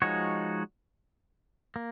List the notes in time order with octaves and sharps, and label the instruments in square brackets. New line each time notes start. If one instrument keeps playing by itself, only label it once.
[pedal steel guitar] F3 G#3 D#4 F#4 C#5
A#3